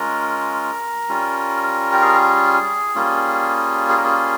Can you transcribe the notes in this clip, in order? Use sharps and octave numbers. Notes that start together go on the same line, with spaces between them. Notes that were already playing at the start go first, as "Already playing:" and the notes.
Already playing: G#3 C#4 F4 A#4
G3 C#4 F4
G4
G#4
G3 A#3 C#4 F4
G#4
A#4
G#4